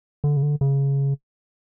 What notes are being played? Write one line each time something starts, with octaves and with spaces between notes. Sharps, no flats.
D3
C#3
D3
C#3